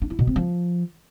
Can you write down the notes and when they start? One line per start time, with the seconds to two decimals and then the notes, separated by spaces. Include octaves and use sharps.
0.02 D4
0.10 E4
0.19 B2
0.27 C4
0.36 F3